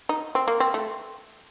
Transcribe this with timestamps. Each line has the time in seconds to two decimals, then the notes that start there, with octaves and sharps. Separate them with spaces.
0.09 D#4
0.35 C4
0.48 A#3
0.60 C4
0.74 A3